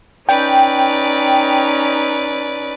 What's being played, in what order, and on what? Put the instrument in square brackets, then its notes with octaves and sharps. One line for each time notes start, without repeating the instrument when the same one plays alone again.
[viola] C#4 D#4 [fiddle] B4 D5 [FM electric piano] G5